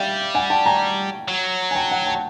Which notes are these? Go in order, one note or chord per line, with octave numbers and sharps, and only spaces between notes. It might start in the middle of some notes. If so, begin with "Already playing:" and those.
Already playing: G3 E5 F5 G5
F#5 G#5
G5 A5
G#5 A#5
F#3
G#5
G5 A5
F#5 G#5
G5 A5